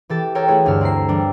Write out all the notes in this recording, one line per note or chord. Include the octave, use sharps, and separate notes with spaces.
E3 G4 A4 A6
A4 A#4 C#5 G5
A3 B3 E4 F#4 G#4 C#5
D2 G2 D3 E6 F6
C4 E4 A#5 C7
E3 G3 D4